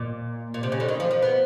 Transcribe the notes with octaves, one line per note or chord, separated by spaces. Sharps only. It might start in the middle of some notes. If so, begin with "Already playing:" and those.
Already playing: A#2
A#2
C3
C#3
D3
D#3
F3
F3
B3